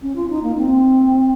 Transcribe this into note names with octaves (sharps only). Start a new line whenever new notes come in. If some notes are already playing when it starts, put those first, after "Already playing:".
C#4
F4
D#4
A#3
C4